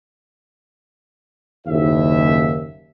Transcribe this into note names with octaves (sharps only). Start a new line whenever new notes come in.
F#1 D#2 E5